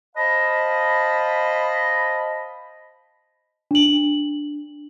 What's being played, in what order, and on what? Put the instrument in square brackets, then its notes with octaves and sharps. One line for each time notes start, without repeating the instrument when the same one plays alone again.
[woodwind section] C5 D#5 F5 A5 B5
[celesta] D4 F#7